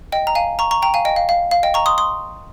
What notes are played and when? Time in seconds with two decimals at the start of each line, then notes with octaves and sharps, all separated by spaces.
0.12 D#5 G5
0.27 A#5
0.35 F5 G#5
0.59 A#5 C#6
0.71 A#5 C#6
0.82 G5 A#5
0.94 F5 G#5
1.05 D#5 G5
1.16 F5
1.29 F5
1.51 F5
1.63 D#5 G5
1.74 A#5 C#6
1.86 C6 D#6
1.98 C6 D#6